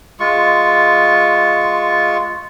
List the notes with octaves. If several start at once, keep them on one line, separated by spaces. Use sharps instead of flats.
G#3 F4 C#6